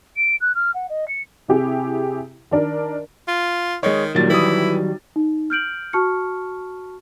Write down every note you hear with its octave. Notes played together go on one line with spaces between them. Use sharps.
D7
F#6
F6
F#5
D#5
C#7
C3 E4 G4 G#4
D#3 D4 A#4
F4
D#3 G#3 C#5
A#2 D#3 F#3 G3 A6
E3 E4 D#6
D#4
F6 G6 D7 F#7
F#4 A5 C#6 F6 C#7